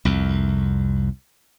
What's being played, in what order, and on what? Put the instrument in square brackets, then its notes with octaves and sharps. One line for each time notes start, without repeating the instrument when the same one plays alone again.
[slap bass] C2 F2